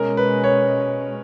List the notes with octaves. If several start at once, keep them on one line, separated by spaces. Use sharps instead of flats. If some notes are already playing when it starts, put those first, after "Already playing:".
Already playing: B2 G#3 C#4 A#4
B4
C#5